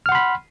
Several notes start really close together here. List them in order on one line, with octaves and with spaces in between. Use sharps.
F6 F#5 C6 B5